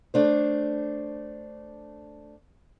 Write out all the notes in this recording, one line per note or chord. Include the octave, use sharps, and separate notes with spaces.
A3 D4 C5